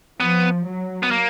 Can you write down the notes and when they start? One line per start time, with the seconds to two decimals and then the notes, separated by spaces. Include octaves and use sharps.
0.20 F3 B3
0.66 F#3
1.03 B3
1.11 A#3